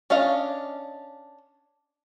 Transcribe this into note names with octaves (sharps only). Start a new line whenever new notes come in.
C#4 D4 D#5 F5